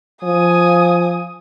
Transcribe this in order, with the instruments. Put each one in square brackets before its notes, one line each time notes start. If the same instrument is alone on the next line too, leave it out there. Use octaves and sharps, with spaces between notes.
[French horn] F3 [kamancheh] G#5 D#6